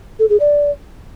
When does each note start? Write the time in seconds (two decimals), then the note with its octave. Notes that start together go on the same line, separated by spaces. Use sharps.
0.19 A4
0.29 G#4
0.40 D5